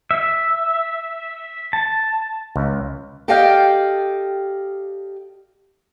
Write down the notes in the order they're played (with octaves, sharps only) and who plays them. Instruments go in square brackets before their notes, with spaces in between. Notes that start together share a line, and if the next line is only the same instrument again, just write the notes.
[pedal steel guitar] E5
A5
[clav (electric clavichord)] C#2
[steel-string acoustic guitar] G4 A4 D5 D#5 F5 G5